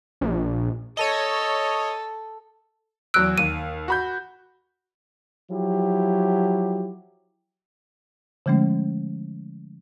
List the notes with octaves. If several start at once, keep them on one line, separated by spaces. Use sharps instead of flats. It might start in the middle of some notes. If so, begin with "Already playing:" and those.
A#1
A4 C#5 D#5
E2 F#3 E6 F#6 D7
D#2 D#7
F#4 B5 G6
F3 F#3 E4 G4
D3 F3 G#3 A3 C#4